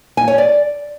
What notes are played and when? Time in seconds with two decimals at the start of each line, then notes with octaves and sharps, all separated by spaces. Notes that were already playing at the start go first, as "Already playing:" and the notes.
0.17 G#5
0.28 C#5
0.38 D5